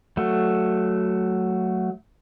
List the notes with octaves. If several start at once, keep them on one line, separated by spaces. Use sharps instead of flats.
F#3 A3